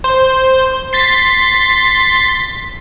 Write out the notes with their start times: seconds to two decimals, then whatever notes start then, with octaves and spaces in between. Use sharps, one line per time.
0.04 C5
0.93 C6 A6 B6